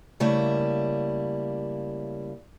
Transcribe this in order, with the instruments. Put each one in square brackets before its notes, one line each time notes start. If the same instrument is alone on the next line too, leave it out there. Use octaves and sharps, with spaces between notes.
[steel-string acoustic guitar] C#3 G3 A3 A#3 E4